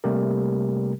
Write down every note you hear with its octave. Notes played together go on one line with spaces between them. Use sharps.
C3 G3 A3 A#3 G4 A#4